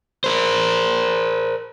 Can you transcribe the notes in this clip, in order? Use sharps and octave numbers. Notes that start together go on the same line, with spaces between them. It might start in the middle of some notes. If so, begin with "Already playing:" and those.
A#4 C5